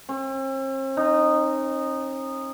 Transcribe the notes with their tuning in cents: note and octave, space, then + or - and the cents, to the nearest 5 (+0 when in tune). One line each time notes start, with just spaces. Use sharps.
C4 +45
D#4 -15